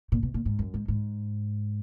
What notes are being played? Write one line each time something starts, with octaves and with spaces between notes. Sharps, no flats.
A#2
B2
A#2
G#2
F#2
G#2
G#2